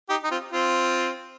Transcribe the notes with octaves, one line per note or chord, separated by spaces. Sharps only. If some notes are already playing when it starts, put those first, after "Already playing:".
D#4 G4
D#4
C4 F4
C4 F4